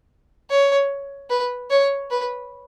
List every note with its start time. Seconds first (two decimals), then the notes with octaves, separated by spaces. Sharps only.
0.50 C#5
1.30 B4
1.70 C#5
2.11 B4